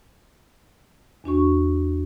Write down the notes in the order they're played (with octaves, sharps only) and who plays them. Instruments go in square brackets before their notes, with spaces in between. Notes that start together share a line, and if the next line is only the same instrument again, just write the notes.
[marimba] E2 D4 F#4 C#6